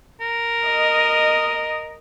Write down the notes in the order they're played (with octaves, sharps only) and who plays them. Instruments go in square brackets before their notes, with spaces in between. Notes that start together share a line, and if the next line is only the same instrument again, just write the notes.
[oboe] A#4
[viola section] D#5